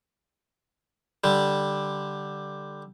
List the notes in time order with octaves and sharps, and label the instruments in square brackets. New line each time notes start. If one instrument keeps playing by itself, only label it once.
[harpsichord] D3 G3